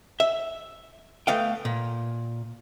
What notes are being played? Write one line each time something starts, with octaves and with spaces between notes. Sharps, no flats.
E5
A3 B3 F5 G5
A#2